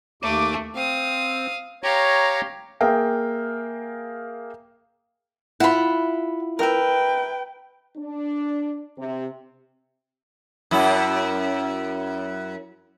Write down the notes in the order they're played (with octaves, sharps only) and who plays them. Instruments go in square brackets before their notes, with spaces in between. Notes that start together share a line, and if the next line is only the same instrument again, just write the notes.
[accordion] D#2 D6 [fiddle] A3
[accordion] C4 [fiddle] F5 D#6
[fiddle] G4 F5 [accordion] C#5 A#5
[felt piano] A#3 G#4 A#4 E5 F5 G5
[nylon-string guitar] E4 F4 [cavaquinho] F#5 B5
[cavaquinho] A#4 E5 [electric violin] B4 G5
[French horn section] D4
C3
[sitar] F#2 E4